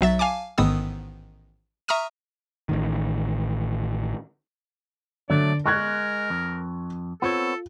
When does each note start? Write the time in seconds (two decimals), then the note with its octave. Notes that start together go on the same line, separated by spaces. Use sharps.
0.01 B1 F#3 E5 A6
0.19 F5 G#5 A5 D6
0.58 A1 G#2 D#3 B3 D#6 E6
1.88 E5 A#5 C#6 D#6 F6 D#7
2.69 A1 A2 D#3
5.30 D3 F#3 A3 D5
5.66 G#3 A#4 C#6 F#6 G#6
6.30 F2
7.22 B3 C4 F4 A4 C#5